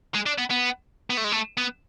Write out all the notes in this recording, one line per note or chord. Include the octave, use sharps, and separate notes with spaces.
G#3
D4
B3
B3
B3
A3
G#3
A3
B3